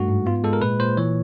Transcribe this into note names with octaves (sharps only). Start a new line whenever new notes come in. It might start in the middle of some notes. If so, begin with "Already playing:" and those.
Already playing: G2 A3 F#4
G#2
B3 F4
G#3 A4
A#4
A#2 B4
A#2 C5
E3 C#5